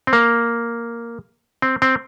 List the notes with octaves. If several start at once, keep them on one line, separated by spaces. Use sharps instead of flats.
C4
A#3
C4
C4